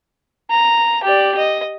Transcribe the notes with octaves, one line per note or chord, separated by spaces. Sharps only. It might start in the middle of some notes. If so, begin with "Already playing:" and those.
A#5
G4 D5
D#5